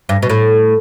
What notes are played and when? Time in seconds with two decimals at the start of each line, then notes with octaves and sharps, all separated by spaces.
0.09 G2
0.23 B2
0.30 A2